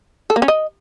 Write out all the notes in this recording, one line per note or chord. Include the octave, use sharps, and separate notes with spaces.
A4
A#3
C#4
D#5